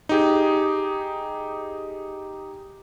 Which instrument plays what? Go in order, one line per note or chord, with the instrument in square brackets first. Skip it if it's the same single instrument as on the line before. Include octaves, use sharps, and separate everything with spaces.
[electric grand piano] D#4 G4 G#4